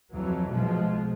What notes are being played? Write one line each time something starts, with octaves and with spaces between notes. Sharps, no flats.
F2 E3 F#3
B1 F3 G#3